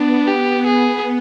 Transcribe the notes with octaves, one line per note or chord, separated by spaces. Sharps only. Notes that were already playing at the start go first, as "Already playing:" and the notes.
Already playing: B3 D4
B3 G4
G#4